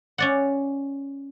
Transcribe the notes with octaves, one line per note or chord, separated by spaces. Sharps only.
C#4 D5 F#5